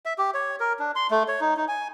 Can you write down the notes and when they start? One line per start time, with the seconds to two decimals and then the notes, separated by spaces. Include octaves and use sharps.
0.06 E5
0.18 G4
0.34 C#5
0.60 A#4
0.79 D4
0.95 C6
1.11 A3
1.28 C#5
1.41 D#4
1.57 D#4
1.68 G#5